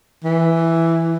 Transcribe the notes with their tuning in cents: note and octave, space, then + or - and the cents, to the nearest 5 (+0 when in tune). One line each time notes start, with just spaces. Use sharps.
E3 +5